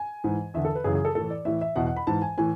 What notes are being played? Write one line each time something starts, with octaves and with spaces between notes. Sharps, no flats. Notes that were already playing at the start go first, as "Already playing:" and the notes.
Already playing: G#5
G#2 E3
E2 D3 E5
A4
B4
F#2 C#3 E3 G#4
G#4
A4
A2 E3 A4
D5
A2 E3 E5
E5
E2 B2 F#5
F#5
B5
G#2 E3 A5
G#5
A2 E3 G#5